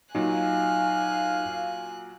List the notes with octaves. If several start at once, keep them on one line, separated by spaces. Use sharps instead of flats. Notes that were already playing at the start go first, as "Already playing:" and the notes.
A#2 F#3 D#4 F5 G#5 F#6